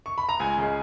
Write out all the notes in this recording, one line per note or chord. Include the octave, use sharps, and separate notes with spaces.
C#6
B5
A#5
C#2 G#5
C#3 G#3